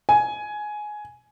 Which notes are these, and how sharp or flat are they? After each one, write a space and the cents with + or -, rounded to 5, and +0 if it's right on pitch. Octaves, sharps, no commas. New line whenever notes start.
G#5 +15